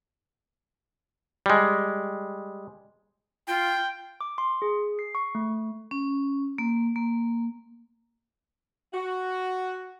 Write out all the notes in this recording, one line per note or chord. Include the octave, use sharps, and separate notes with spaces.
G3 G#3
F4 G5
D6
C6
G#4
C7
C#6
A3
C#4
A#3
A#3
F#4